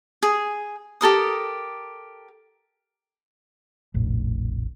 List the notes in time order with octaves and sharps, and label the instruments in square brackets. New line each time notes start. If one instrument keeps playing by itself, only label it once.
[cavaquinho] G#4
G4 A4 A#4 D#6
[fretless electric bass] F1 A#1 A2